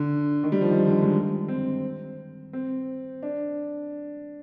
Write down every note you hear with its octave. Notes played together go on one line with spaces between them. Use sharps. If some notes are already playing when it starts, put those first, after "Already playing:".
Already playing: D3
D#3
G3
F3
D#3
D3
D3
G#3
C4
C4
D4